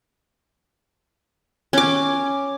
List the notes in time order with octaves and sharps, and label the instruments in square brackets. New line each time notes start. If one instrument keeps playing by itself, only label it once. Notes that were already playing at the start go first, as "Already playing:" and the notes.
[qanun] C#4 D6